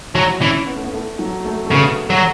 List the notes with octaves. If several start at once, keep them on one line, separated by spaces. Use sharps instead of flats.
F#3 E4
E3 C#4
B3
A3
B3
A3
F#3
A3
A3
C#3 B3
F#3